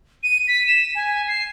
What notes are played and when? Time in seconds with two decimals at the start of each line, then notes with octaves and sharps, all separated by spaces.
0.23 D#7
0.48 B6
0.67 E7
0.95 G#5
1.28 C7